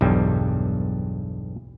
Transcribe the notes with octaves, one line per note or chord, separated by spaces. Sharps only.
B1 E2 G2 G3